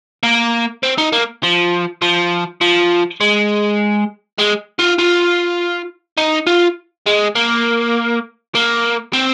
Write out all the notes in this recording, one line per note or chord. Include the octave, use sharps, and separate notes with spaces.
A#3
C4
D#4
A#3
F3
F3
F3
G#3
G#3
F4
F4
D#4
F4
G#3
A#3
A#3
C4